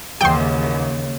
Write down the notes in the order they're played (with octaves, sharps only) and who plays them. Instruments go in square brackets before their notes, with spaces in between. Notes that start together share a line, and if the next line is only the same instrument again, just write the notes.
[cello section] D#2 [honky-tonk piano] G#2 E3 [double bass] C#3 [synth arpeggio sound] G5 C6